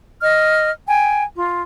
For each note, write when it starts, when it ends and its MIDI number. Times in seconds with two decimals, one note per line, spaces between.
0.22 0.70 75
0.22 0.70 89
0.87 1.22 79
0.87 1.22 80
1.36 1.62 65